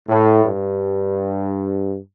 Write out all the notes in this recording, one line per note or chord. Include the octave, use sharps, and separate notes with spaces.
A2
G2